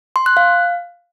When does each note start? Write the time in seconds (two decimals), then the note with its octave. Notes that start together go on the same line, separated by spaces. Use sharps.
0.16 C6
0.26 F#6
0.37 F5